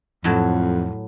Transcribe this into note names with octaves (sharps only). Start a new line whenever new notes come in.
F2 A2 F#3 A5